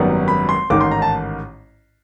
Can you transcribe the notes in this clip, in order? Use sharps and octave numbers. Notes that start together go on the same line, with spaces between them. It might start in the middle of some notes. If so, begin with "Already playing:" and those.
Already playing: G#1 F#2 D#3 G3 B3
B5
C6
A1 G#2 D#3 D6
C6
A#5
A5